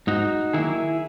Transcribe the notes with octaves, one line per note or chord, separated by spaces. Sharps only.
G#2 D#4 F#4
D#3 F#3 A#3 E4 G#4